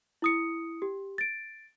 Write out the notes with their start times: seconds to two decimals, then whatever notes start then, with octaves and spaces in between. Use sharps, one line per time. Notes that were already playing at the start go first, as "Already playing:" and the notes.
0.22 E4 D#6 C#7
0.82 G4
1.18 A6 D7